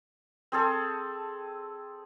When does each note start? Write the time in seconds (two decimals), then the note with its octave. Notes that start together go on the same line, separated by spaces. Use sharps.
0.52 C4 G#4 A4 A5